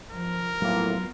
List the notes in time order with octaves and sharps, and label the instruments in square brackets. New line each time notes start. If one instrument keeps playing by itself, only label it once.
[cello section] F3 [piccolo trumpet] A#4
[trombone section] A2 A#3 [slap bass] F#3 [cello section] B3 F4